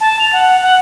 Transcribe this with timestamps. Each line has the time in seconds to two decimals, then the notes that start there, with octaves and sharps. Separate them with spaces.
0.01 A5
0.19 F7
0.33 F#5
0.61 F#5